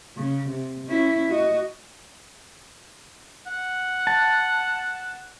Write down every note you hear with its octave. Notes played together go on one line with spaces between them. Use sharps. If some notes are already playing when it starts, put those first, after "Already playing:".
C#3
C3
C#4 E4
F#4 D#5
F#5
A5